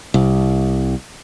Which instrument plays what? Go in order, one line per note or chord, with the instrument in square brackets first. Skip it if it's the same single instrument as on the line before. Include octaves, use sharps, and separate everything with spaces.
[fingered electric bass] C2